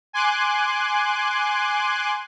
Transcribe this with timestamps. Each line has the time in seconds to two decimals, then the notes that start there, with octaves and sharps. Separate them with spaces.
0.13 G#5 C6 D6 F#6